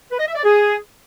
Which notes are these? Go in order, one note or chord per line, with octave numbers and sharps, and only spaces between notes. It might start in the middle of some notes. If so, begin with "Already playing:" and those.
B4
D#5
E5
D5
G#4